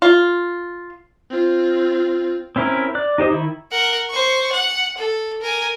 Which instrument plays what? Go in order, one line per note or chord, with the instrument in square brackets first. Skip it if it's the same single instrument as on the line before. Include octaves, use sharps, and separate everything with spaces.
[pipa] F4
[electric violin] C4 F4
[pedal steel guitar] C4 C#4 E4 A#4
D5 F#6
D#4 G4 C5 D#5
D#3 E4
[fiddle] A#4 F#5
C5 C#6
F#5
A4
A#4 G#5